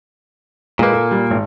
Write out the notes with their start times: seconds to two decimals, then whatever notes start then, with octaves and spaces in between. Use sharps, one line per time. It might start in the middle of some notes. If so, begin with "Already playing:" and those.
0.79 A#2 G#3 A#3 B4
0.93 A4
1.11 G3
1.31 G#1